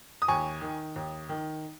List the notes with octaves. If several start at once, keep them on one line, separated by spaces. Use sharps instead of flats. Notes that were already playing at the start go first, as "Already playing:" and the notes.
D#6
D#2 G#5 C#6
D#3
D#2
D#3